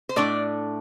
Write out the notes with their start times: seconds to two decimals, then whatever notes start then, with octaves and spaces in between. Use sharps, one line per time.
0.09 C5
0.16 A2 A3 D4 D5